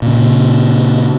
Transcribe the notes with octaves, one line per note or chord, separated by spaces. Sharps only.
A#2 C#3